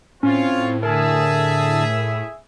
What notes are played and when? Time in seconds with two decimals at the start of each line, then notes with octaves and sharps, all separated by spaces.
0.23 A2 C4 C#4 F4 C#5
0.83 D3 G#4 A#4 E5 A5